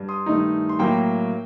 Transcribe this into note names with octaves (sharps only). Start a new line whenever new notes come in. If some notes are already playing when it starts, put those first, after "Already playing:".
Already playing: G2
C6 D#6
G2 D#3 A3 D#4
C6
A2 F#3 A#3 G5 A#5